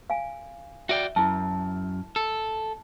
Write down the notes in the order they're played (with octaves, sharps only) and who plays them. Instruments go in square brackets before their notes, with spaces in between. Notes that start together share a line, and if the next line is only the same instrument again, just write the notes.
[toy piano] F5 G#5
[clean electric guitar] F#4 D5 G5 [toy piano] E5
[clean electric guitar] F#2 [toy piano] E4 A5
[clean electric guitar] A4